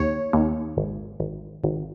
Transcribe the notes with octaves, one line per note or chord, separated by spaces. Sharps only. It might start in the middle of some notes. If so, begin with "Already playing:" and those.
Already playing: D#2 C#5
D#2
G#1
G#1
G#1